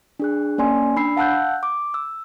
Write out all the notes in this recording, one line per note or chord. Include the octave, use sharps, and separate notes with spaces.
D4 G#4 F#6
A#3 C#4 D5 G#5 C6
D4 B5 E6 C7
F5 F#5 A5 E6 F#6 G6
D6
E6